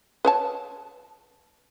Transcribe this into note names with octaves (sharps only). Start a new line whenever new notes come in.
B4 C#5 A5